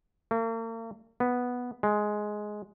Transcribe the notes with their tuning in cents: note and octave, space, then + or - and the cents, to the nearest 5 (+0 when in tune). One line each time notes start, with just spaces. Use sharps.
A#3 -45
B3 -5
G#3 +10